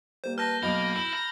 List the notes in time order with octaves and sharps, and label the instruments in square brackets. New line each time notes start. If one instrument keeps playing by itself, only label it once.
[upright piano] G3 A#3 [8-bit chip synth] C5
[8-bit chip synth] B4 A5 [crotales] F6 G6 A#6
[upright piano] B1 D#5 F7 [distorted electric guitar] A#3 [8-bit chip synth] B5
[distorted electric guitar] E4 [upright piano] F#7
[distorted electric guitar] A#5